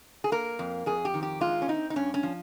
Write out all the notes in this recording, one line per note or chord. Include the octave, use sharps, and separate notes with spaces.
G#4
A#3 A#4
F2
F2 G#4
G4
D#3
G4
G#3 F4
C#4
C4 D#4
D#4
G2 C#4
C#4
F3